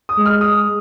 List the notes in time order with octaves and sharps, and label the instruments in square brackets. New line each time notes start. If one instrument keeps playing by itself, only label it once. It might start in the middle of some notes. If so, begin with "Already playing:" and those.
[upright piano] D#6
[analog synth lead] G#3
[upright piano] F6
D#6